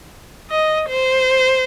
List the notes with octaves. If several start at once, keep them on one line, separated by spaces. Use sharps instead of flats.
D#5
C5